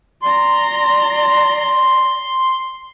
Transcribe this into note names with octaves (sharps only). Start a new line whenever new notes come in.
D5 A#5 C6